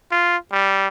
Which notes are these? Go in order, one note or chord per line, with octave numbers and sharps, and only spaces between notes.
F4
G3